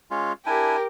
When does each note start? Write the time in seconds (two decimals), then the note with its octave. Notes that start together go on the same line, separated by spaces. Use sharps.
0.11 G#3 C#4 F4
0.46 D4 E4 G4 A#4 G#5